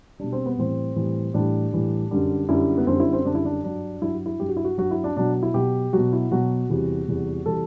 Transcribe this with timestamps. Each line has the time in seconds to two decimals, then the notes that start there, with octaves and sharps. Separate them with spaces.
0.20 B2 G3 D4
0.32 C4
0.46 B3
0.58 A2 E3 G3 C4
0.96 A2 E3 G3
1.34 A2 E3 G3 D4
1.72 A2 E3 G3
2.11 F#2 D3 G3
2.49 F#2 D3 G3 E4
2.78 B3
2.87 F#2 D3 G3 C4
3.00 E4
3.13 C4
3.25 F#2 D3 G3 D4
3.35 E4
3.45 D4
3.64 G2 F#3 D4
4.02 G2 F#3 E4
4.14 F#4
4.26 E4
4.40 G2 F#3 G4
4.49 F#4
4.57 E4
4.64 F#4
4.78 G2 F#3 F#4
4.91 E4
5.04 D4
5.17 B2 F#3 D4
5.43 E4
5.54 B2 F#3 G4
5.93 B2 F#3 F#4
6.13 E4
6.31 B2 F#3 F#4
6.69 E2 C3 E3 G3
7.08 E2 C3 E3 G3
7.46 C3 E3 G3 A4